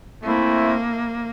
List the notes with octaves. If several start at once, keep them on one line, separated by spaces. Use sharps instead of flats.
A3 A#3 C4 E4